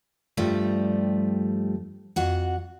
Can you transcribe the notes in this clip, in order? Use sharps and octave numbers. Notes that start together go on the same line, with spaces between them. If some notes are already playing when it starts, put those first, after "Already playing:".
G2 F3 G3 A3
F2 F#4 F#5